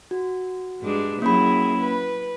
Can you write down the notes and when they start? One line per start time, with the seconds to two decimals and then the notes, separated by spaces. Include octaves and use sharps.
0.11 F#4
0.81 G2 G#3 D4
1.22 F#3 A#3 C#4 E4 G#4 B5
1.78 B4